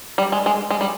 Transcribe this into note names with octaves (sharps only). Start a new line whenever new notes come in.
G3
G#3
G#3
G#3
G3